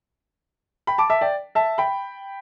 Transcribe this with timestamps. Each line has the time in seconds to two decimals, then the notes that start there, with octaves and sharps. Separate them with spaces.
0.87 G5 B5
0.98 A5 D6
1.10 E5 A5
1.21 D5 G5
1.55 E5 A5
1.78 G5 B5